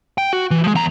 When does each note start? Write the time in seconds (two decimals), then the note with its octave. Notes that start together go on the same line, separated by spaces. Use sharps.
0.18 G5
0.33 F#4
0.51 E3
0.64 F3 G#3
0.75 E2 A#5